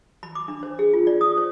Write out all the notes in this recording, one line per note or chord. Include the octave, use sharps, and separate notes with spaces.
B5
D6
D4
C5
G#4
F4
D5
D#6
C5